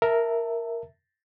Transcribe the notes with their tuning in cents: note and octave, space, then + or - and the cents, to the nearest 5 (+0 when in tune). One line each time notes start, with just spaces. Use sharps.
A#4 +0 E5 +0 A5 +20